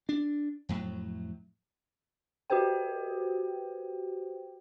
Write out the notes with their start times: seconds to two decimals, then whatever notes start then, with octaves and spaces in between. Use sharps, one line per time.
0.09 D4
0.69 F2 A2 F#3
2.50 F#4 G4 B4 C5 G5